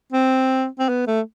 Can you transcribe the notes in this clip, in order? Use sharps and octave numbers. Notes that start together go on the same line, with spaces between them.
C4
C4
B3
A3